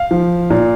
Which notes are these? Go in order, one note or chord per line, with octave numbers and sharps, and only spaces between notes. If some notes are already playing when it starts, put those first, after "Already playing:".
Already playing: F5
F3
A#2